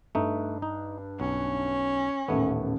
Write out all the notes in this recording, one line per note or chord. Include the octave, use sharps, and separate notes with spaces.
G2 A3 D#4
D#4
B1 C#4
D#1 A1 D#2 A3 B3